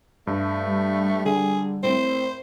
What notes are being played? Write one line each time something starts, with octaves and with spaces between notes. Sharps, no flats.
G2 A3
G3
D3 G#4
A2 C4 C5